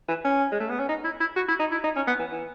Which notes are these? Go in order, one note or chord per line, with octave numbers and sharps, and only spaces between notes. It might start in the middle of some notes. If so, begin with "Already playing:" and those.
E3
C#4
G#3
A3
B3
C#4
D#4
E4
E4
F#4
E4
D#4
E4
D#4
C#4
B3
E3
E3